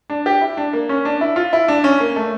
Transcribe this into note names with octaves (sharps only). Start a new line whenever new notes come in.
D4
G4
E4
D4
A#3
C#4
D4
E4
F4
E4
D4
C#4
A#3
A3